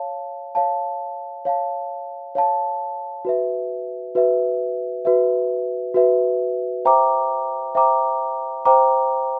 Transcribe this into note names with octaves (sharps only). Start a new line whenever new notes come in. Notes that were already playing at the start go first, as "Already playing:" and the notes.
Already playing: C#5 F5 A5
C#5 F5 A5
C#5 F5 A5
C#5 F5 A5
F#4 B4 E5
F#4 B4 E5
F#4 B4 E5
F#4 B4 E5
C5 E5 G5 A#5 D6
C5 E5 G5 A#5 D6
C5 E5 G5 A#5 D6